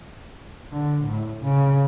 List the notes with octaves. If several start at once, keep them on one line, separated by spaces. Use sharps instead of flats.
D3
A2
C#3